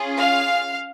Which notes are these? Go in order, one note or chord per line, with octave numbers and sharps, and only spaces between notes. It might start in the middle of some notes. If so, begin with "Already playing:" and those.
Already playing: C#4 F4 G#4
F5